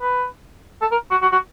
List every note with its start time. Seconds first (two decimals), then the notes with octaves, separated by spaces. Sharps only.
0.01 B4
0.81 A4
0.91 A#4
1.11 F#4
1.22 F#4
1.32 F#4